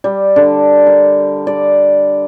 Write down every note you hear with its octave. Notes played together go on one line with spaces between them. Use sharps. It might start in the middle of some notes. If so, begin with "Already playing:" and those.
G3
D3
A#4
D5